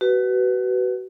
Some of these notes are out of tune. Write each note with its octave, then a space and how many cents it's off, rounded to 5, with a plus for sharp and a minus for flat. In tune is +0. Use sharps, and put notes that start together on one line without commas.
F#4 +30 B4 +0